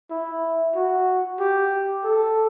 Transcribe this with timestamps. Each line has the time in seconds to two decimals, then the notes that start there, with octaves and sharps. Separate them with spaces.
0.11 E4
0.75 F#4
1.39 G4
2.04 A4